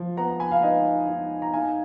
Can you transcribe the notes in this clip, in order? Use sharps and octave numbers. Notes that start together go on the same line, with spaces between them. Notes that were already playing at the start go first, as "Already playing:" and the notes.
Already playing: F3
B3 F#5 A#5
G#5 B5
F5
D#4 B4 D#5
D#4
A#5
D#4 F5 G#5